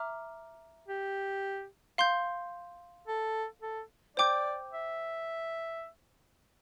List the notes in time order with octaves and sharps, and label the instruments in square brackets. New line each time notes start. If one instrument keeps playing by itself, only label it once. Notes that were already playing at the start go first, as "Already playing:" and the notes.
Already playing: [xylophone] E5 A#5 D6 F6
[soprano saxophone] G4
[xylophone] F5 C6 G6
[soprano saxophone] A4
A4
[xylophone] C5 G5 D6 G6 [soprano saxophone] D5
[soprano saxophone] E5